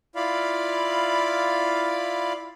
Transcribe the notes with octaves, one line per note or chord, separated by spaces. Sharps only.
E4 F4 D5 F5 B5